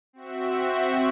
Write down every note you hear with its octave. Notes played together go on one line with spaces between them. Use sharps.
C4 F#4 E5